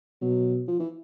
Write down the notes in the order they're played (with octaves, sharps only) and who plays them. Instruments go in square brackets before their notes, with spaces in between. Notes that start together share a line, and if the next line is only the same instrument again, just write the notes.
[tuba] B2 [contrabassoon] F#3
[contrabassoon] F3
E3